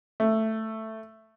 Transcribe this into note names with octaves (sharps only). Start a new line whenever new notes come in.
A3